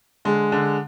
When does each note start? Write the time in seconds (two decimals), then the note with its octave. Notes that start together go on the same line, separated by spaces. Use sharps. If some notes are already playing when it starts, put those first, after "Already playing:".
0.25 D3 G#3
0.52 D3